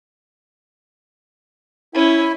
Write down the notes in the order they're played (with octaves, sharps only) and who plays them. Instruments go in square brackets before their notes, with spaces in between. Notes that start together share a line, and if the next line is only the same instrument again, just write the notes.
[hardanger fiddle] C#4 [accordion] E4